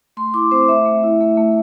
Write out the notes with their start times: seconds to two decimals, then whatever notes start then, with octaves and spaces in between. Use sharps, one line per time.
0.17 A3 C6
0.34 E4 D6
0.51 C4 C5
0.68 A3 E5
0.86 A3
1.03 E4
1.20 A3
1.37 A3